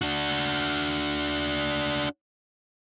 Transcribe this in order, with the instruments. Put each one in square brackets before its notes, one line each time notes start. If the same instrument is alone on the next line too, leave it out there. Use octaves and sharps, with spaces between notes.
[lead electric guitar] D4 F#4